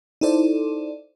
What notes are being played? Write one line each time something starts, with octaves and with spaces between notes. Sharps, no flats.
D#4 E4 A4 C5 D5